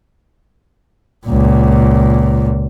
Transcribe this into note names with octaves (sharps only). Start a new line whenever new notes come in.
C#2 A#2